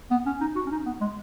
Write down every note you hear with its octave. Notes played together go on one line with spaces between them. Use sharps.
B3
C#4
D#4
F#4
C#4
D#4
B3
G#3